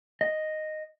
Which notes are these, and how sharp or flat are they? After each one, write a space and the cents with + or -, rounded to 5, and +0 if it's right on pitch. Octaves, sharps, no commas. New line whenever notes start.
D#5 -5